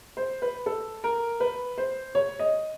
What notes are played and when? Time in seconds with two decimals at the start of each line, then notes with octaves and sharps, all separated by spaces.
0.17 C5
0.42 B4
0.66 A4
1.04 A#4
1.40 B4
1.78 C5
2.15 C#5
2.39 D#5